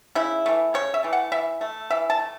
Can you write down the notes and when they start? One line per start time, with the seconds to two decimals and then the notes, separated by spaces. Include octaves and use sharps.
0.15 C#3 E4
0.46 E3 A3
0.74 C#3 C#5
0.94 E5
1.03 E3 A3
1.13 F#5
1.32 E3 E5
1.61 A3
1.90 E3 E5
2.10 A5
2.19 A3